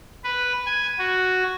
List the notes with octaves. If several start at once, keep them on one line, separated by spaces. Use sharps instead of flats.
B4
G#5
F#4